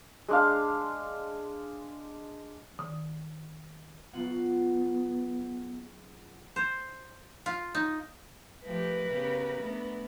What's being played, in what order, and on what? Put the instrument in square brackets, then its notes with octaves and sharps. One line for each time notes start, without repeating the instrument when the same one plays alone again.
[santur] G#3 D4 F5
[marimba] D#3
[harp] F#1 F4 F#5 [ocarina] B3
[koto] C5
F4
D#4
[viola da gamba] F3 A3 G4 [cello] A#4 B4
[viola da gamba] C#3 B3 G4
A3 B3 D4